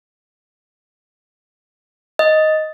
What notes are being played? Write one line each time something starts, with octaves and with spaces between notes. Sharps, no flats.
D#5